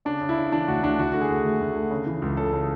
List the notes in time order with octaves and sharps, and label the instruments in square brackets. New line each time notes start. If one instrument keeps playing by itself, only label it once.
[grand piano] C#3 D4
C#3
E4
C#3
E3 D4
D2 F#4
D2 D4
D2 F#4
D3 F#4
G#4
D2
D2
D2
D3
C#3
E3
C#2
C#3 A4
C#3